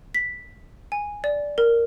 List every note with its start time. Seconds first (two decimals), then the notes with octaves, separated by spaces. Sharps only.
0.15 B6
0.92 G#5
1.24 D5
1.58 A#4